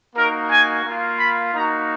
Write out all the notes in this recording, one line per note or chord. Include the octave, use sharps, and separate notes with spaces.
A#3 D#4 F#4 A#4
G#5
A#3 F4
B5
A#3 D#4 F#4 A#5